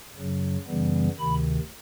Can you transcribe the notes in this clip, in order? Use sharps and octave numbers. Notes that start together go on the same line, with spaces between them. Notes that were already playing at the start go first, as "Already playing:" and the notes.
F#2 C#3 F#3
F#2 C#3 E3 G3 B3
D2 C3 D#3 B5